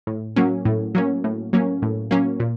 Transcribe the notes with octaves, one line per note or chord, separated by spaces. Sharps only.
A2
F#3 A#3 C#4
A2
F#3 A#3 C#4
A2
F#3 A#3 C#4
A2
F#3 A#3 C#4
A#2